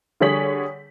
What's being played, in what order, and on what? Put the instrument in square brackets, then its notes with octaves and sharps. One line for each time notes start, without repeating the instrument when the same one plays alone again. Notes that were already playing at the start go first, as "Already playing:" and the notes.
[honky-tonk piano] D3 G3 G#4 C#5 B6 F#7